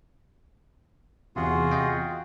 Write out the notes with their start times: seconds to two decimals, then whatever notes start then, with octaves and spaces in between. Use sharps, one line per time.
1.36 E2 C3 F4 F#4 G#4
1.71 D#5 G5